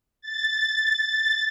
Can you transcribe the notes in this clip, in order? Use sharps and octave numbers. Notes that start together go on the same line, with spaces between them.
A6